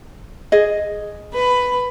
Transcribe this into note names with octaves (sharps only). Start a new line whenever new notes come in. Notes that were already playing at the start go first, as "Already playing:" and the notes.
G#4 D#5
B4 B5